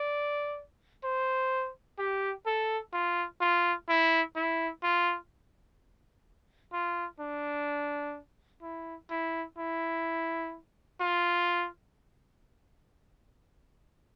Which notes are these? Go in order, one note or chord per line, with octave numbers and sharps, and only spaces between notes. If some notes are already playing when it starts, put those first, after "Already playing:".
Already playing: D5
C5
G4
A4
F4
F4
E4
E4
F4
F4
D4
E4
E4
E4
F4